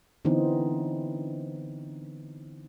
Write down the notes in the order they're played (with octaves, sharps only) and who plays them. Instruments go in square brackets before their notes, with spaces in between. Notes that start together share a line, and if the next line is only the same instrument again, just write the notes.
[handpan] D3 E3 B3 C4 D#4